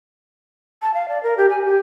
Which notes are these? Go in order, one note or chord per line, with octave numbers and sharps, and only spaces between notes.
A5
F5
D5
A#4
G4
G#5
G4